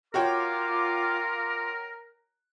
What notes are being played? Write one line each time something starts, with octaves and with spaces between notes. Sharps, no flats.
F4 F#4 A#4 C#5 G5 D6